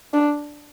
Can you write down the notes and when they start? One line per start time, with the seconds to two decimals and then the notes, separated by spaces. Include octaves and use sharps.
0.14 D4